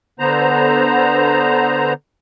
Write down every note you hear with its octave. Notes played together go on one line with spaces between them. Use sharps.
D3 B3 C5 A#5